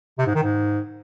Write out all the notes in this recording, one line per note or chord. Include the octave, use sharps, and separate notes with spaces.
C3
G#2
D#3
G#2